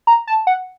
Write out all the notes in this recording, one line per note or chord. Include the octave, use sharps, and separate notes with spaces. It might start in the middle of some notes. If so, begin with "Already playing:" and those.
A#5
A5
F#5